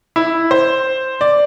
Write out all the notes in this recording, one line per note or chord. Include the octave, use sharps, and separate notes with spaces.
E4
C5
D5